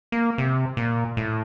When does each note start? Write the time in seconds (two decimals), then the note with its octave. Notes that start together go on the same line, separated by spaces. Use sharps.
0.12 A#3
0.38 C3
0.77 A#2
1.17 A2